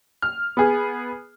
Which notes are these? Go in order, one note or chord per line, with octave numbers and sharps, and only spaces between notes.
F6
B3 G#4